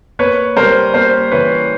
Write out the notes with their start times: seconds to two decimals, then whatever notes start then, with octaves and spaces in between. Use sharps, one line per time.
0.19 A#3 B4 C#5
0.56 G3 A#4 C5
0.94 A#3 A#4 C5
1.31 E3 B4 C#5